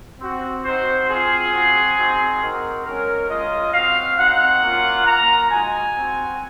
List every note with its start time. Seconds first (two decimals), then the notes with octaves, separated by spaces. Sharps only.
0.20 C4 F#4
0.65 C4 D#4 F#4 C5
1.09 C4 F4 G#4
1.52 C4 F#4
1.97 C4 D#4 F#4
2.41 C4 D#4 F#4 A#4
2.85 G#3 C#4 F#4 A#4
3.29 G#3 C#4 F4 D#5
3.73 C4 F#4 F5
4.18 C4 D#4 F#4 F#5
4.62 A#3 C#4 F4
5.06 A#3 F4 A#5
5.50 G#3 D#4 F#4 G#5
5.95 C4 F#4